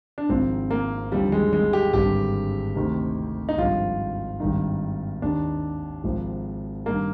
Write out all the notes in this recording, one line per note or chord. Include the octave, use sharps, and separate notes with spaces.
D4
G#1 G#2 F3 C4
A#3
D#2 D3 F3 G3
G#3
G#3
G4
G#1 G2 D3 G4
D2 C3 D#3
D#4
G#1 G2 F3 F4
G#1 G2 D#3
D#2 D#3 D4
G#1 G#2 F3
G2 D#3 A#3